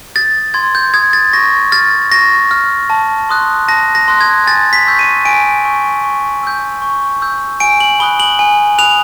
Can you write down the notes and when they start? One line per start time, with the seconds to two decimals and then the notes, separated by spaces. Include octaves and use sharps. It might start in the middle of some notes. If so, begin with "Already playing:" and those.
0.15 D#6 G6 A6
0.54 C6 G#6
0.75 G6
0.94 D#6 G6 G#6
1.13 A6
1.33 C#6 A#6
1.72 F6 A6
2.11 C#6 A#6
2.51 F6
2.90 A5
3.29 C6 D#6 F#6
3.68 A5 A#6
3.95 A#6
4.08 C6 D#6 F#6
4.21 G#6
4.47 G#5 A6
4.73 B6
4.86 C#6 E6 G6
4.99 D#7
5.25 G#5 D7
5.65 C#6 E6 G6
6.04 C#6
6.43 E6 G6
6.82 C#6
7.22 E6 G6
7.60 G#5 D7
7.80 F#7
8.00 B5 D#6 F#6 G7
8.20 F#7
8.39 G#5
8.78 B5 D#6 F#6 F7